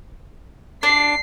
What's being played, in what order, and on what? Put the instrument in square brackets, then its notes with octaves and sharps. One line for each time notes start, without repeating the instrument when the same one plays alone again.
[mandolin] D4 [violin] C7